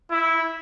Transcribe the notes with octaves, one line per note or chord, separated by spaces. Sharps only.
E4